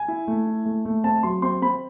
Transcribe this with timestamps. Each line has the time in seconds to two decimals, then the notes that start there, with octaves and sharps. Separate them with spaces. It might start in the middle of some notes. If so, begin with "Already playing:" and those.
Already playing: G#5
0.08 E4
0.27 A3
0.46 E4
0.66 A3
0.85 A3
1.04 C4 A5
1.23 F#3 C6
1.42 C4 C6
1.62 C4 B5